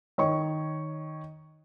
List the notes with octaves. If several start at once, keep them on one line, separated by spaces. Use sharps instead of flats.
D#3 C#5 D#5 C#6